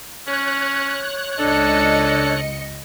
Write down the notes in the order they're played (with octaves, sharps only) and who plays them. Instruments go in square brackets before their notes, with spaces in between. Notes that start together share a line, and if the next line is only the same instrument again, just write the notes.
[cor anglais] C#4 [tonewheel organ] C#5 F#6
[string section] C#2 D#5 C#7 [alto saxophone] D4 [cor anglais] A4